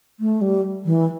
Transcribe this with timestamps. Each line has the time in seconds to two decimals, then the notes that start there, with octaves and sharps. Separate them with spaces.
0.20 A3
0.41 G3
0.85 E3